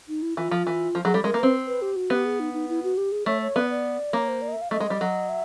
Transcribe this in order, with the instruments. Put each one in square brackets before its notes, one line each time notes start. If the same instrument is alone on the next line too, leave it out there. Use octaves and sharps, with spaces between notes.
[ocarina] D#4
E4
[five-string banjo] E3 [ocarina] F4
[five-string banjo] F3
E3
F3
[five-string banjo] F#3 [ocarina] G#4
[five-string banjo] G3 [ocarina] A4
[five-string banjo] G#3 [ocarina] A#4
[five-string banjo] A#3
[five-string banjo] C4 [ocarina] B4
[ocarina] B4
G4
F#4
[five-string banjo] B3 [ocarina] G4
[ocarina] G#4
D#4
D#4
E4
F#4
G4
G#4
[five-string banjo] A3 [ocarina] C#5
[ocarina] C#5
[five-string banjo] B3 [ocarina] D5
[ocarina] D5
[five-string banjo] A#3 [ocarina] C#5
[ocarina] C5
D5
D#5
E5
F5
[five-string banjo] A3 [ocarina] D#5
[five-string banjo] G#3
G3
F#3
[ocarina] E5